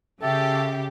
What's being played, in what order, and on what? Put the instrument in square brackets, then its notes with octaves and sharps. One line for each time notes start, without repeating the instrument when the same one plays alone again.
[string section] C#3 G4 [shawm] A4 [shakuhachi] E5